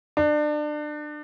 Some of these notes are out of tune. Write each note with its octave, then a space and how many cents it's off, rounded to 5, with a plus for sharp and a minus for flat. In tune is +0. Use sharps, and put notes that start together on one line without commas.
D4 +30